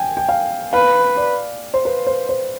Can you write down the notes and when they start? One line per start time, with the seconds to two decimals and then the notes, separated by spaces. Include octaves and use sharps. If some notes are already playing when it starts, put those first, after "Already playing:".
Already playing: G5 G#5
0.17 G5
0.29 F5
0.73 B4 F5
1.17 D5
1.74 C5
1.85 B4
2.07 C5
2.29 C5